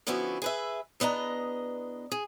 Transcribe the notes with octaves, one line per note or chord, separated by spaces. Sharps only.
D3 F3 B3 C#4 E4 F#4
G#4 B4 E5
E2 B3 D4 D#5 A#5
G#4